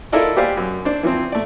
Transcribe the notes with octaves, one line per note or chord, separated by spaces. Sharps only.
E4 F4 A4 A#4 D5 D#5
G4 B4 C5 D5 F5 G#5
F#2
D4 C5 D5
E3 F3 C4
A3 D5